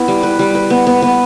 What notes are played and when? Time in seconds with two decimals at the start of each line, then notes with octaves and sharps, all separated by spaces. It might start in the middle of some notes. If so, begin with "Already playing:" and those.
Already playing: B3 E4
0.08 G3
0.23 B4
0.39 G3
0.55 B4
0.70 B3
0.87 B3
1.02 B3